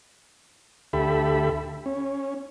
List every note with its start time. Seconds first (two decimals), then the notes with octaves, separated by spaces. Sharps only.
0.93 D2 G4 A4 E5 B5
1.86 C#4